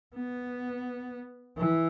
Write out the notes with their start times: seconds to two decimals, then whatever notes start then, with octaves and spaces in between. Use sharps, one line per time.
0.16 B3
1.58 E3